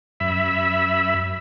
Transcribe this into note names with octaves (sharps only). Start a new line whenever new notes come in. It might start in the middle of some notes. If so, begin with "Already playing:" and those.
F#2 E5 B5